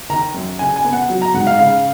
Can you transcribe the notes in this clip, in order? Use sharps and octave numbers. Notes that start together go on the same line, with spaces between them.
D#3 A#5
F#2
C#3 G#5
G#5
B3
F#5
F#3
A#5
G#2 F#5
F5
C#3 F5